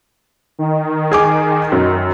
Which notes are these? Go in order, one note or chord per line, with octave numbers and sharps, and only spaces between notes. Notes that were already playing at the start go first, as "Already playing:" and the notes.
D#3
G#4 G#5 D6
F#2